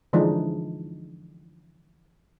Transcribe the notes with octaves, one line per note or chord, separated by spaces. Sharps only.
D3 E3 F3 G#3 D4 D#4